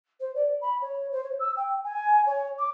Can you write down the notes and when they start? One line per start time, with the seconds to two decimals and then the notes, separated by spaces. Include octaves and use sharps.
0.20 C5
0.34 D5
0.61 B5
0.81 C#5
1.12 C5
1.24 C#5
1.39 E6
1.56 G5
1.84 G#5
2.26 C#5
2.58 D6